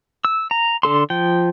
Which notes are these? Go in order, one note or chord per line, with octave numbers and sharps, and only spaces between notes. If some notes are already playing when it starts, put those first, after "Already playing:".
E6
A#5
D3 A4 C6
F3 G5